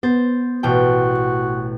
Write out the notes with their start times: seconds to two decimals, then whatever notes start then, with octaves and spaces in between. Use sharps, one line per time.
0.03 B3 C5 A6
0.63 A1 B2 F#4 G5